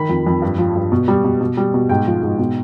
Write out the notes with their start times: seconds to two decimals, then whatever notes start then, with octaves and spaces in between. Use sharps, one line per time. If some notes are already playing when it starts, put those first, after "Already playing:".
Already playing: D#3 B5
0.09 F2
0.27 F2
0.42 G2
0.58 F3
0.76 G2
0.92 B2
1.08 G3
1.24 B2
1.41 B2
1.57 G3
1.74 B2
1.89 G#2 G5
2.07 F3
2.23 G#2
2.39 B2